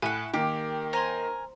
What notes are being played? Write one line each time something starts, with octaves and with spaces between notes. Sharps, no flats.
A2 E4 F#5 G#5 F#6
D#3 A#3 G4 G5
A#4 C5 G#5 A#5 C6